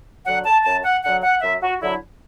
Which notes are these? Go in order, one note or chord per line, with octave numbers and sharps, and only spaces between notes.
D3 F#3 F#5
A5
F#2 A5
F#5
D3 F#3 F#5
F#5
F#2 E5
F#4
D3 F#3 E4